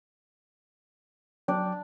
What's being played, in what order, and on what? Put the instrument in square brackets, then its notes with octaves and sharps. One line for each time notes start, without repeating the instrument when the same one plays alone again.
[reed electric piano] F#3 G5 D6 [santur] D4